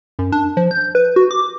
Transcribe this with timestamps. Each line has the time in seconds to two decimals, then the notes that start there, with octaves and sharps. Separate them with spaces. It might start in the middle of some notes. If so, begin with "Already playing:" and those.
0.19 F#2
0.32 D4
0.57 F3
0.71 G6
0.95 B4
1.16 F#4
1.31 D6